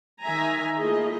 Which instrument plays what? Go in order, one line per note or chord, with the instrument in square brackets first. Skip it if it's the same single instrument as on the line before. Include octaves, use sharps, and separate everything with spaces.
[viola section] D#3 E5 G#5 A#5
A3 A#3 E4 F4 G#4 D#5